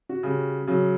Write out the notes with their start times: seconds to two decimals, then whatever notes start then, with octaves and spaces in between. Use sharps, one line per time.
0.09 F#4
0.23 C#3 G3
0.67 C#3 F#3